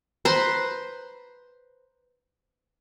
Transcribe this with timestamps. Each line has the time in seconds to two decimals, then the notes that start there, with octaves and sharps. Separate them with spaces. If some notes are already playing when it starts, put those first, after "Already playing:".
0.25 B4 C5 A#5 C6